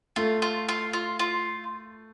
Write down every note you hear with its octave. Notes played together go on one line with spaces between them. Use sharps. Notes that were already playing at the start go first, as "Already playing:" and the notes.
A3 F4
F4
F4
F4
F4